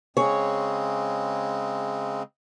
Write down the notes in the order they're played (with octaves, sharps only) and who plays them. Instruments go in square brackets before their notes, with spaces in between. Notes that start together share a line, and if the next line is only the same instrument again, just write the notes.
[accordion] C#3 G#3 C4 [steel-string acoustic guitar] G#4 C#5